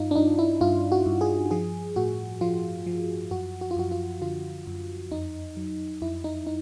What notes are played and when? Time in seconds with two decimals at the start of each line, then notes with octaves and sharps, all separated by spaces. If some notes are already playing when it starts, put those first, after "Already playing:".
Already playing: G2 D#4 F4
0.11 D4
0.15 G2 D#4
0.39 E4
0.61 G2 F4
0.92 F#4
1.06 G2
1.21 G#4
1.51 F3 G#4
1.96 A2 F#4
2.41 F3 F4
2.86 F3
3.31 F#2 F#4
3.61 F#4
3.71 F4
3.76 F#2 F#4
3.91 F4
4.22 D3 F4
4.67 F#2
5.12 F2 D#4
5.57 F#3
6.01 F2 E4
6.24 D#4
6.47 D#4